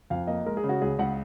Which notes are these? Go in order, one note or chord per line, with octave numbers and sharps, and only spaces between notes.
F2 F5
A#3 D#5
G#3 A#4
G#4
C#3
F#4
C#2 G#4
C#2 F#5